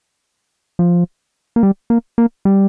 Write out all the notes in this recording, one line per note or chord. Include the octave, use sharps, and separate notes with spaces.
F3
A#3
G3
A#3
A#3
G3